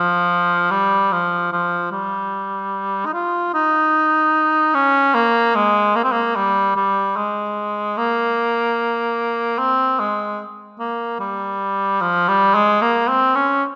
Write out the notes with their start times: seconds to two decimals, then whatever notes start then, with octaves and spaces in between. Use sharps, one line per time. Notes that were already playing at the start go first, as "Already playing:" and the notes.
Already playing: F3
0.71 G3
1.12 F3
1.53 F3
1.92 G3
3.06 D#4
3.14 F4
3.54 D#4
4.75 C#4
5.14 A#3
5.55 G#3
5.96 A#3
6.04 C4
6.12 A#3
6.36 G3
6.76 G3
7.16 G#3
7.97 A#3
9.58 C4
9.99 G#3
10.79 A#3
11.20 G3
12.01 F3
12.28 G3
12.55 G#3
12.82 A#3
13.08 C4
13.35 C#4